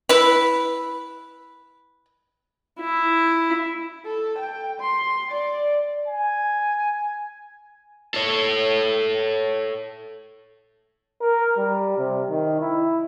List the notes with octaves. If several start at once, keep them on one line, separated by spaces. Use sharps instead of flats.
E4 B4
E4
A4
G5
C6
D5
G#5
A4 C#5
A#4
G3
C3
D#3
E4